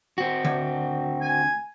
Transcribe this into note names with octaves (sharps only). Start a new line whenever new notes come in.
C4 F#4
D2
G#5